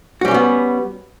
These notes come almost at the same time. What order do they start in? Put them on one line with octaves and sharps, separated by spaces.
F#4 G3 C#4 A#3 B3